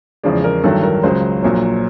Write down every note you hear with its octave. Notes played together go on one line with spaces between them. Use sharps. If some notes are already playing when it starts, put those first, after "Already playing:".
E2 C#3 F3 G#3 D5
A#4
A1 G2 D#3 F#3 A4
A#4
C#2 C#3 F#3 C5
A#1 A#2 F#3